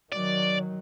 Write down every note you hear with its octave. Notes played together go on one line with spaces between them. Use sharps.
D#3 F#3 D5